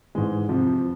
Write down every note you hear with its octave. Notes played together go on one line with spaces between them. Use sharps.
G#2 E3 G#3
F2 C3 F3